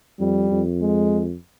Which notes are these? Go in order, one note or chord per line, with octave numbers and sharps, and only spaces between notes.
F2 G3
F2
G#3